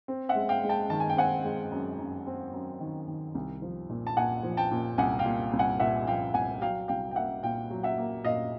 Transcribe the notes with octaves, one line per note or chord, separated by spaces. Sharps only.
C4
E5 F#5
G#3
F5 G5
G#3
G5 A5
D#3 A5
G#5
G5
C4 F#5 G#5
G#3
F#2
F#2
C4
F#2
D#3
D#3
C2
F3
A#2
A5
A#2 F#5 G#5
F3
G5 A5
A#2
C2 F#5 G#5
F5 G5
A#2
C2
F#5 G#5
A#2 E5 F#5
F3 F5 G5
C2 F#5 G#5
F#3 F5 G5
C2 F5 G5
G5
A#3 E5 F#5
A#2 F5 G5
F#3
E5 F#5
A#3
A#2 D#5 F5